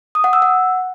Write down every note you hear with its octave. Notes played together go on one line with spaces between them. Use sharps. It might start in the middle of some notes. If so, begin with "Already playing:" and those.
D#6
F#5
E6
F#5